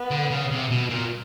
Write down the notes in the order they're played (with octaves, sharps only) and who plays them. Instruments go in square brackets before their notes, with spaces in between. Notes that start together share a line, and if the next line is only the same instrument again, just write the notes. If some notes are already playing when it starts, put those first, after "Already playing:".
Already playing: [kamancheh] B3
[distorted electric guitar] D3
C#3
C3
B2
A#2